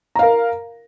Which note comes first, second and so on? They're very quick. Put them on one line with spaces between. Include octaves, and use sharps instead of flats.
A#5 F5 A#4